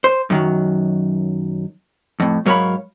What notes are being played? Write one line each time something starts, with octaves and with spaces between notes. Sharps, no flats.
C5
F#2 D#3 F#3
F2 A2
G#2 F#3 A#4 C#5 F5 B5